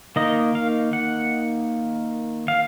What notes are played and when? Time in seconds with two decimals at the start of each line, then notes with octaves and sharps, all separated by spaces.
0.16 D#3 A#3 D#4 D#5
0.55 F5
0.93 F#5
2.48 F5